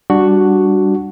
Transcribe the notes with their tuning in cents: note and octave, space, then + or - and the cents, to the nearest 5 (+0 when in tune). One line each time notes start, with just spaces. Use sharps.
G3 +0 D4 +0 F#4 +0